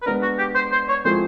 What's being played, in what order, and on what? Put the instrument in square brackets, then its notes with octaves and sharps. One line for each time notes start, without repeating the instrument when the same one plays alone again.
[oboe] B4
[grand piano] G#3 B3 D4 [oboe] A#4
[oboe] F#4
G4
C5
C5
C#5
[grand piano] F3 G#3 C4 E4 A4 [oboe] C5